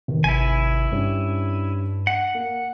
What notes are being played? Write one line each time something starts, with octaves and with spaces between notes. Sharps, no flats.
F1 D#3
G#1 E4 G#5
G2 G3 C#4 D4
F#5
A#3